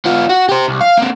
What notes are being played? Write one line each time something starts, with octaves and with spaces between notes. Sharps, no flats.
B3 F4
F#4
G4 C5
C2
F5
A#3 C4